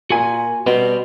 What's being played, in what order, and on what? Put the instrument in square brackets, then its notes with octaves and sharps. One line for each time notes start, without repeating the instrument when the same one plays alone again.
[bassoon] A#2 [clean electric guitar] F#4 G#5
[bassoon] B2 [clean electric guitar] G3 B3 C4